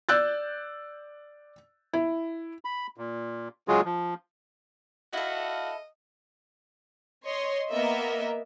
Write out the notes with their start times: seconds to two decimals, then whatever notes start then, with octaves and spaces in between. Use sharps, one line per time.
0.09 D5 E6 F#6 G6 A6
1.93 E4
2.65 B5
2.97 A#2
3.68 C#3 F#3 G#3 F4 F#4 G#4
3.85 F3
5.13 E4 F#4 A4 D#5 F5
7.26 C#5 D#5 C6
7.71 A#3 B3 A#4 D#5 E5